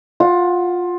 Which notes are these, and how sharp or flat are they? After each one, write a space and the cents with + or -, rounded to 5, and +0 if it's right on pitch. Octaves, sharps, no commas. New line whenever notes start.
F4 +15 F#5 +0